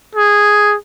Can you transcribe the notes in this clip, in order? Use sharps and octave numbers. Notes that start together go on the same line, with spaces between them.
G#4